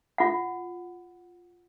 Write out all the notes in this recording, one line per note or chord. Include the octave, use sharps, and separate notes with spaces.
F4 F#5